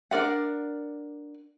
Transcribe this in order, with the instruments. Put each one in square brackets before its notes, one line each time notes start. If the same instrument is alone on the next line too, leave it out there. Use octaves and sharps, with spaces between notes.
[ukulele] D4 A#4 D5 F#5